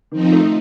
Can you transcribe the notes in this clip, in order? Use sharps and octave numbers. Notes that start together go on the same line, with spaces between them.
D#3 F3 C4 D#4
A3